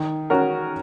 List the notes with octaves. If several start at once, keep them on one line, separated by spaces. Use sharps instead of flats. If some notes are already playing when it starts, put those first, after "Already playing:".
Already playing: D#3
C#4 F#4 A#4